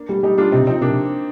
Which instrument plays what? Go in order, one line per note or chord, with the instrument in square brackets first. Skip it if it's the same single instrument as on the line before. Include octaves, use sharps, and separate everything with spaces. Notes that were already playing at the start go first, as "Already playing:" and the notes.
Already playing: [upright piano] A#3 D4
[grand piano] G3
[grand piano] G3 [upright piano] D#4 G4
[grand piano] G3 [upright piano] D4 F4
[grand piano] C3 [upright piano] C4 D#4
[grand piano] F3 [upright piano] C4 D#4
[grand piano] C3 [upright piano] A#3 D4